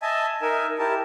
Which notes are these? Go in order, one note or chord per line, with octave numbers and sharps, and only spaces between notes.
D#5 E5 G#5 A5
D#4 A#4 E5 G#5
E4 G4 A#4 A5